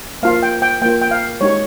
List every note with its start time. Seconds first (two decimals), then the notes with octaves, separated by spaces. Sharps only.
0.23 A#3 F4 F5
0.43 G5
0.62 G5
0.81 A#3 F4 G5
1.01 G5
1.11 F5
1.41 G#3 D#4 G4 C#5